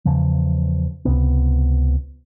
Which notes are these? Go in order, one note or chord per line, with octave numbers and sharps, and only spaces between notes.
E2 C#3 F3
C#2 C3 B3